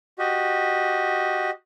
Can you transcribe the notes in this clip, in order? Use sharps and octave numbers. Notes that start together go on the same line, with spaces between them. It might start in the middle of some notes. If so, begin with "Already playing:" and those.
F#4 G4 D#5